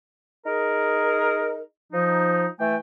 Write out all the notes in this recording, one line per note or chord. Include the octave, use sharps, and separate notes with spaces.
D#4 G#4 A#4
F3 D#4
E3 A3 G5 G#5